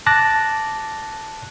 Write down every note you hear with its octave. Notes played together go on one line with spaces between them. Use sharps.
A5 D6 F#6 A6 A#6